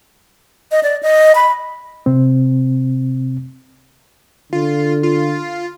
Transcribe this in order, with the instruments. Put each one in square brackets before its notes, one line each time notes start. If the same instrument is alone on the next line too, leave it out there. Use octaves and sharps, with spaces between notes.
[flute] D#5
D5
D#5
B5
[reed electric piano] C3 C4
[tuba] D3 [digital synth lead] F4
[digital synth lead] F4